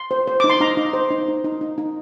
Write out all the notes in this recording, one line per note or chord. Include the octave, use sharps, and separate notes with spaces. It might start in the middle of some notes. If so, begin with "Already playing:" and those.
Already playing: C6
C5
C5
D#4 D6
C6
D#4 A#5
D#4
C5
D#4
D#4
D#4
D#4
D#4